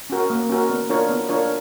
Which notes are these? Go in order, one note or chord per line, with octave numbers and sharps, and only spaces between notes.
C#4 F#4 A#4
A#3
C#4 F#4 A#4
B3
D4 F4 A#4 C#5
B3
D4 F4 A#4 C#5